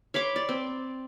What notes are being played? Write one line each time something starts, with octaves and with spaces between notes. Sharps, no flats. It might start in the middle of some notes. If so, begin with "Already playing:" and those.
C#5 B5 C6 D6
D5
C4